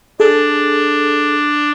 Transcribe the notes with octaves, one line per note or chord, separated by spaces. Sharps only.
D4 G#4 A4